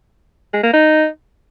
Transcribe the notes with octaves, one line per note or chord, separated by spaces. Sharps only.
G#3
A#3
D#4